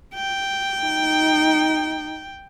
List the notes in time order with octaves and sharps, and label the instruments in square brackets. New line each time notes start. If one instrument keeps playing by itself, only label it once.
[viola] G5
[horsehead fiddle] D#4